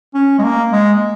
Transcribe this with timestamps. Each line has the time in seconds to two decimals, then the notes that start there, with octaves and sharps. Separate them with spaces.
0.14 C#4
0.39 G#3
0.43 A#3
0.73 G#3